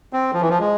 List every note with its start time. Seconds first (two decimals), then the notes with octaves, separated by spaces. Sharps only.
0.13 C4
0.34 F3
0.41 E3
0.49 F3
0.60 G#3